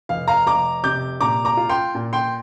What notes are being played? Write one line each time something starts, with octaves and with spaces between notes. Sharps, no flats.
F1 F5
F5 A#5
F1 A#5 D6
C3 D6 G6
A#2 A#5 D6
A#5 D6
F4
G5 C6
A#2
G5 C6